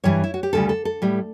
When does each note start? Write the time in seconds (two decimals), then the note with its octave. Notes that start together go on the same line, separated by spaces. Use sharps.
0.04 G2 E3 G3 C#5
0.24 E4
0.34 F#4
0.43 G4
0.53 D2 C#3 G3 A4
0.69 A4
0.85 A4
1.02 A2 G3